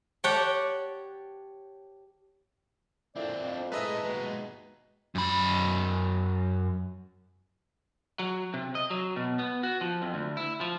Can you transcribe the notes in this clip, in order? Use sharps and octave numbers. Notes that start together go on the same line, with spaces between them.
G4 C#5 D5 F#5 G5 A5
A#2 A3 C4 D4 E4 D5
F2
G#3 A3 E4 A4 B4 D#5 E5 A#5
D#2 B2 G#3
F#2 B5
F#3
C3
D#5
F#3
B2
B3
F#4
F3
F2
D2
E4
F3